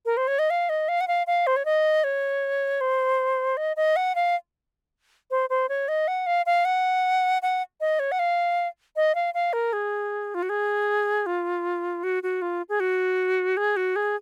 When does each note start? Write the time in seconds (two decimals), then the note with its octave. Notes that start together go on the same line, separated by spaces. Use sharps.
0.06 A#4
0.17 C5
0.28 C#5
0.39 D#5
0.50 F5
0.69 D#5
0.89 F5
1.01 F#5
1.08 F5
1.27 F5
1.47 C5
1.56 C#5
1.65 D#5
2.04 C#5
2.81 C5
3.57 D#5
3.77 D#5
3.96 F#5
4.15 F5
5.31 C5
5.50 C5
5.69 C#5
5.88 D#5
6.08 F#5
6.26 F5
6.46 F5
6.65 F#5
7.42 F#5
7.81 D#5
7.99 C#5
8.12 F#5
8.19 F5
8.96 D#5
9.15 F5
9.34 F5
9.53 A#4
9.73 G#4
10.35 F4
10.43 F#4
10.49 G#4
11.26 F4
12.04 F#4
12.23 F#4
12.42 F4
12.69 G#4
12.80 F#4
13.57 G#4
13.77 F#4
13.96 G#4